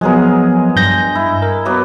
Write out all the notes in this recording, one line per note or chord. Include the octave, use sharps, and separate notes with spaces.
F3 F#3 G#3 B3 G#4 A#4
G2 G6 A#6
E4
A#4
F#3 A#3 B3